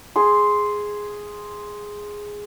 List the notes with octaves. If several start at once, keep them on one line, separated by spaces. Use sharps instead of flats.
G#4 C6